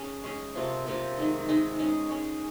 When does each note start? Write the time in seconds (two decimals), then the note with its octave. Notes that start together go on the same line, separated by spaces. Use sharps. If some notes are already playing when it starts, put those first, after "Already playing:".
Already playing: C#4 G#4
0.24 G#3 C#4 G#4
0.55 C3 F3 A#3 F4
0.86 C3 F3 A#3 F4
1.17 D#3 G#3 D#4
1.49 D#3 G#3 D#4
1.79 G#3 C#4 G#4
2.10 G#3 C#4 G#4